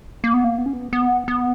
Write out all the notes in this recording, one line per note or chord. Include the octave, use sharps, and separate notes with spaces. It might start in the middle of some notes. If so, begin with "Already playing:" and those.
A#3
B3
A#3
B3
C#4
B3
B3
B3